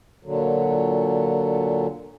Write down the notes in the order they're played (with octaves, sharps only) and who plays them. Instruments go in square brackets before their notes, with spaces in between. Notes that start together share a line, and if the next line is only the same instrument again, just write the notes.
[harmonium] A#2 D3 F#3